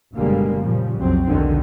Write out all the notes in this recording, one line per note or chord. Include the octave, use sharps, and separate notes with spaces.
F#1 B2 D3 G3 G#3 A#3
A#2 C#3 F3 G3
B1 F2 F#3 C4
B1 E2 D3 D#3 F#3